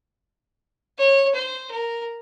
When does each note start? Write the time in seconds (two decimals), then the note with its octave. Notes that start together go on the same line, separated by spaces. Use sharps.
0.98 C#5
1.34 C5
1.71 A#4